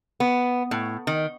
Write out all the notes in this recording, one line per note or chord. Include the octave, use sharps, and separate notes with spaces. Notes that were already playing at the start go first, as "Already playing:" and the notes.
B3
A2
D#3